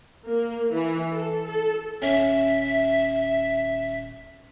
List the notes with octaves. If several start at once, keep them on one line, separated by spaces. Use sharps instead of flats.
A#3
E3
A4
A4
D#1 C#4 E5